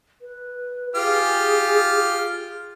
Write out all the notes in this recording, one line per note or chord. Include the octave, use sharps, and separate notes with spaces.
B4
F4 G4 G#4 F6